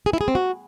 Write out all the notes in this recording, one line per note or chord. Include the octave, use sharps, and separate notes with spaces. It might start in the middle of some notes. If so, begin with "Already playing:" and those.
G#4
E4
G#4
C4
F#4